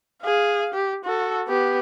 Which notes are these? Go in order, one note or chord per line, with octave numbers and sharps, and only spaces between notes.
G#4 F5
G4
F#4 A4
B3 G4